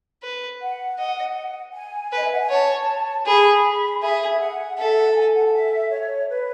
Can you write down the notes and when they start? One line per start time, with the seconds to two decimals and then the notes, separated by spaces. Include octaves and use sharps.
0.23 B4
0.61 F#5
0.98 D#5
1.74 G#5
2.12 B4 D#5
2.24 E5
2.33 F#5
2.42 G#5
2.50 C#5 A5
3.26 G#4 B5
4.01 G#4 E5
4.40 F#5
4.77 A4 E5
4.97 F#5
5.11 A5
5.16 G#5
5.34 F#5
5.46 F#5
5.53 E5
5.90 C#5
6.29 B4